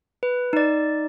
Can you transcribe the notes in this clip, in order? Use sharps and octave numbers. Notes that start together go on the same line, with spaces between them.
B4
D#4 D5